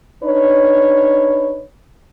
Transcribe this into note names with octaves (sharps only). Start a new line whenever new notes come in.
D4 D#4 B4 C#5